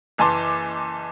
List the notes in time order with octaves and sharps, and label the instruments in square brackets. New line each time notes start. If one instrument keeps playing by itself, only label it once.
[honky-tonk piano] F#1 E3 G#5 A5 C6 D6